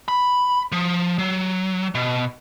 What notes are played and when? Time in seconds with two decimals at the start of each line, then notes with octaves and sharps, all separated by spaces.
0.08 B5
0.72 F3
1.19 F#3
1.95 B2